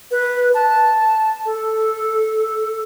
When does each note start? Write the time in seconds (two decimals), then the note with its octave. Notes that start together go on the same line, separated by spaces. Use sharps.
0.11 B4
0.54 A5
1.46 A4